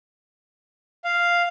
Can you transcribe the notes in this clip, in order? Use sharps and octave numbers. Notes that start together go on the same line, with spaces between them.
F5